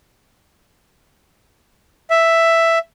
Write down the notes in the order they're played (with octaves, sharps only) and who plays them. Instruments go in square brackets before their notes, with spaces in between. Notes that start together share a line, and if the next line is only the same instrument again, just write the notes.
[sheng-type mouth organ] E5